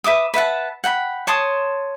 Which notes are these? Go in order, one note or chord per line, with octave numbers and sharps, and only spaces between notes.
B4 E5 D6 D#6
B4 E5 F#5 A5
F#5 G5 A#5 B5
C#5 A5 C6 D#6